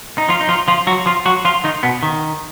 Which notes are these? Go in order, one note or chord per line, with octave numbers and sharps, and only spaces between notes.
D#4
F3 F4
D#4
F3 F4
F3 F4
F#3 F#4
F3 F4
F#3 F#4
F3 F4
D#3 D#4
B2 B3
D#3